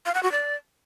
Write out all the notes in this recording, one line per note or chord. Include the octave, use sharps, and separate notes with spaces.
F5
F#5
F#4
D5